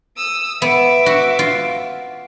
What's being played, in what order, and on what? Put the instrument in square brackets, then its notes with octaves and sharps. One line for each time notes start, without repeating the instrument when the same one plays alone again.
[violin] D#6 E6
[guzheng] B3 [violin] E5 D6
[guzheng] F#4
F4